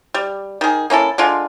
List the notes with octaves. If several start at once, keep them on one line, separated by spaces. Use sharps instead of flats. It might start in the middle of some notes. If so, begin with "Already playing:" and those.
G3
D#3 G#4
A#3 C#4 E4 A4
D3 G#3 F4